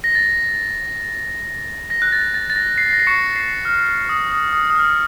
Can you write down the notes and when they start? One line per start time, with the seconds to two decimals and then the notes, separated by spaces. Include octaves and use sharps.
0.04 A#6
0.15 A6
1.90 A#6
2.02 F#6
2.12 A6
2.34 A6
2.50 A6
2.56 A#6
2.78 C7
2.93 A#6
3.00 C7
3.07 C#6 C#7
3.36 C7
3.65 F6
4.09 D#6
4.31 D#6
4.53 D#6
4.70 D#6
4.75 F6